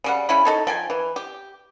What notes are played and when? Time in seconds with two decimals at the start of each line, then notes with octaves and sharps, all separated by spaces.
0.04 C#3 G3 F#5
0.29 C#3 C#4 E4 B5
0.45 D#4 A4 C#5
0.67 F3 G5 G#5
0.90 E3
1.16 G4